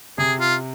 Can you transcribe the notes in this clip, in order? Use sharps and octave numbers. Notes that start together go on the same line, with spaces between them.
C3 G#4
F4